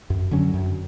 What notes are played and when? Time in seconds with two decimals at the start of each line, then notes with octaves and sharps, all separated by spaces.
0.10 F#2
0.31 D3 F#3 C#4
0.54 F#2